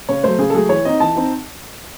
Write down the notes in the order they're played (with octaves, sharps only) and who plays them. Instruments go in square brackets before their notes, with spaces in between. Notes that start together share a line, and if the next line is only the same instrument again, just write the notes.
[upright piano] C#3 C#5
F#3 A3 C5
C#3 G#4
A4
F#3 A3 G#4
E3 C#5
C4 D#4 D#5
E3 A5
C4 D#4